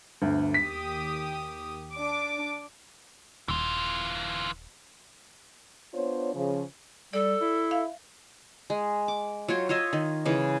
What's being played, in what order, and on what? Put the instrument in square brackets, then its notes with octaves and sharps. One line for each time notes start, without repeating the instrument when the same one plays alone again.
[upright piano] G1 D2
[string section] D#2 G4 D#6 [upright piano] B6
[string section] D4 D6
[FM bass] D#1 [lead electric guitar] E3 F4
[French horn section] B3 D4 F4 C5 C#5
C#3 F3
[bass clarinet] G3 [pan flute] A4 [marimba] D5
[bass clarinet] E4
[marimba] E5 F5
[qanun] G#3
D6
F#3 F4 C#5 G5
F4 C#5 D#5 E5
D#3
C#3 E3 G#3